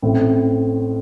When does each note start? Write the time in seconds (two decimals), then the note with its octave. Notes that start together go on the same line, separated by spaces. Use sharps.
0.02 A1 A2 A3 C4